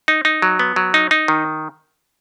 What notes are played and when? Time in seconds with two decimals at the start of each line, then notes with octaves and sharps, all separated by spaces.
0.08 D#4
0.25 D#4
0.42 F#3
0.59 B3
0.76 F#3
0.94 D#4
1.11 D#4
1.28 D#3